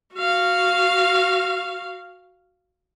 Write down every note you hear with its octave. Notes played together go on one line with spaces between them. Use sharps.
F#4 F5